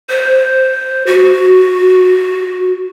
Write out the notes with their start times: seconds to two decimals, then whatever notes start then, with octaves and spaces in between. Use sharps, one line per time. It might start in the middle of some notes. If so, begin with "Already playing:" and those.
0.09 C5
1.07 F#4